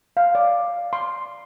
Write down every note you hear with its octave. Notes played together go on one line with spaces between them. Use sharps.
F5
D5
C6